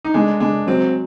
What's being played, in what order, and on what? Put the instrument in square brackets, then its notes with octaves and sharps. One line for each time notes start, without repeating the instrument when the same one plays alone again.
[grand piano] D#4
[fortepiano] G#3 [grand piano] D4
[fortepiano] G#3 [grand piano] D4
[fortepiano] F#3 [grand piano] C4